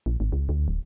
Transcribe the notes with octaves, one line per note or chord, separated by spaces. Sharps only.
A#1
G#1
C#2
D2
D1